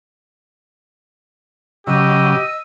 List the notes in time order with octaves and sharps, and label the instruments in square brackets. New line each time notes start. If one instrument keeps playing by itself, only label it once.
[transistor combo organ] C#3 F#3 [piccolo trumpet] G4 [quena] D#5 [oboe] E6